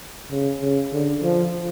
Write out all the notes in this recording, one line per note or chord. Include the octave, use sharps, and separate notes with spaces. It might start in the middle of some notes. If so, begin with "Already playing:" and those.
C#3
C#3
D3
F3